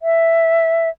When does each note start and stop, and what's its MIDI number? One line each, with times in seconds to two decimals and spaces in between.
0.01 0.89 76